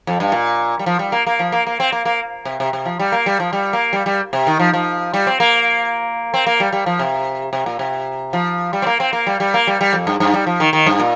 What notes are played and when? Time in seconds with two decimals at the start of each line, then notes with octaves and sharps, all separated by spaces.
0.07 F2
0.20 G2
0.32 A#2
0.79 G3
0.86 F3
0.99 G3
1.12 A#3
1.27 A#3
1.39 F3
1.52 A#3
1.67 A#3
1.80 C4
1.92 A#3
2.05 A#3
2.45 C3
2.60 C3
2.73 C3
2.85 F3
3.00 G3
3.12 A#3
3.26 G3
3.40 F3
3.53 G3
3.73 A#3
3.93 G3
4.06 G3
4.33 C3
4.47 D#3
4.59 F3
4.74 F3
5.14 G3
5.27 C4
5.40 A#3
6.34 C4
6.46 A#3
6.60 G3
6.72 G3
6.86 F3
6.99 C3
7.53 C3
7.66 A#2
7.79 C3
8.33 F3
8.73 G3
8.82 C4
8.87 A#3
9.00 C4
9.13 A#3
9.27 G3
9.40 G3
9.54 A#3
9.67 G3
9.81 G3
9.93 F2
10.07 G2
10.20 G2
10.34 G3
10.47 F3
10.60 D#3
10.73 D#3
10.86 G2
11.00 A#2